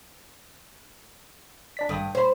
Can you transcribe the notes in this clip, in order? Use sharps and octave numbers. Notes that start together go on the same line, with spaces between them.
D4 D5 B6
G#1 G2 A4 D#6
C5 C#5 B5